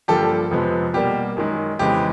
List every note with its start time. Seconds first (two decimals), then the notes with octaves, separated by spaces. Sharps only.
0.08 G2 D3 F3 A#3 G4 A4
0.51 F2 C3 F3 G#3 B3
0.94 B2 G3 A#3 G4
1.37 F#2 D#3 G#3
1.79 F2 C#3 E3 G#3 B3 G4